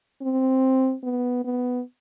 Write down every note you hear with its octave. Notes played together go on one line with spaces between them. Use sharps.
C4
B3
B3